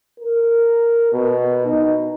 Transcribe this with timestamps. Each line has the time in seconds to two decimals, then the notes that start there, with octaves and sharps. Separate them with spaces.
0.20 A#4
1.13 B2
1.65 D#4